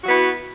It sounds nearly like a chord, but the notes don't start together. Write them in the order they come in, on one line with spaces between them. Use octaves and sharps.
F#4 B3 E4